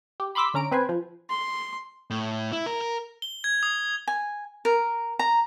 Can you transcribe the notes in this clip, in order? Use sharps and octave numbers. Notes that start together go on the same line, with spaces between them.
G4
B5 C6 D6 E6 B6
D3 C#4 A#5 D7
C4 B4 C5 G#5
F3
C6
A2
E4
A#4
A#4
G7
G#6
D#6
G#5
A#4
A#5